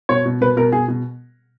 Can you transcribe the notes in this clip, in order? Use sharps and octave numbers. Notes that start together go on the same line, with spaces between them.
B2 C#5
B2
B2 B4
B2 A#4
B2 G#4
B2